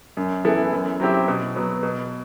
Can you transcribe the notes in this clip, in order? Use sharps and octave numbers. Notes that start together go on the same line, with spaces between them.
F#2
E3 B3 E4 A4
F#2
F#3 C4 E4 G4
B2
F#3 B3
B2